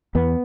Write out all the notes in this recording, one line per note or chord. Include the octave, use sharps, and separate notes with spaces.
E2 B3